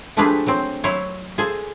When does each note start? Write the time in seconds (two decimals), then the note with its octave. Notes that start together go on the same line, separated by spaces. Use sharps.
0.17 F3 A3 D4 G4 G#4 B4
0.47 F#3 C4
0.84 F#3 E4 C5 C#5
1.38 G#4 A4 C5 G#5